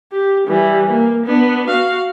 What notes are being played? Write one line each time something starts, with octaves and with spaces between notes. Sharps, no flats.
G4
E3 G3
A#3
B3 D4
F#4 F5